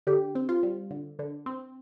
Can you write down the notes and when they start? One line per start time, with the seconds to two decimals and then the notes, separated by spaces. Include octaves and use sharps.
0.07 D3 G4
0.35 C4
0.49 F4
0.63 G3
0.91 D3
1.19 D3
1.46 C4